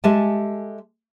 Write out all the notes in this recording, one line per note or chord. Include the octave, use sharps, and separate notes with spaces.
G#3 G4 A4 E5 G#5 A5